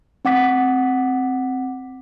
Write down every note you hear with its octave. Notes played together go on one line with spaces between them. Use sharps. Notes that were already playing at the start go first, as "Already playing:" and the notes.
C4 F#5 D6 B6